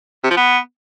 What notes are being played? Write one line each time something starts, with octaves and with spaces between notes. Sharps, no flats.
C3
F3
B3